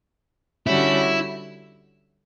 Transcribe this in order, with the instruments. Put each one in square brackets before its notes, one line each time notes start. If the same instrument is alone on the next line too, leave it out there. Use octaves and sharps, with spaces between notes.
[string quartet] D3 G3 C#4 F#4 [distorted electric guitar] E4